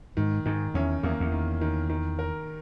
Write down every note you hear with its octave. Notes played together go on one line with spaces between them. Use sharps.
G#2 D#3
G#2 D#3
E2 C#4
E2 A#3
E2
D#3
D#3
D#3
A#4